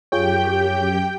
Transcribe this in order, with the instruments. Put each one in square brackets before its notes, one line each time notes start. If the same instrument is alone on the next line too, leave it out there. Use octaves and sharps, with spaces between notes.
[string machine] F#2 G4 G6 [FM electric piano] F4 G#4 C#5 [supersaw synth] G5